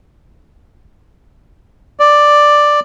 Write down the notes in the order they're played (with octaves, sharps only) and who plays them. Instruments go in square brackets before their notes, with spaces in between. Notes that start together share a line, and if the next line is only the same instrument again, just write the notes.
[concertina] D5